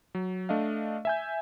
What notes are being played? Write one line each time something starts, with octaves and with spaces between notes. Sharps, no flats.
F#3
A3 D4 D#5 F5
E5 G#5 G6